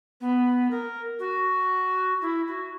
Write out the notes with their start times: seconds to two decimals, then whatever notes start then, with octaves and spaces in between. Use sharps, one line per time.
0.21 B3
0.71 A#4
1.19 F#4
2.21 E4
2.47 F#4